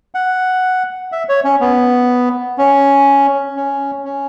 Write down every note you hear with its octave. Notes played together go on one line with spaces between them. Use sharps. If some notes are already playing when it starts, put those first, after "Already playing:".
F#5
E5
C#5
C#4
B3
C#4
C#4
C#4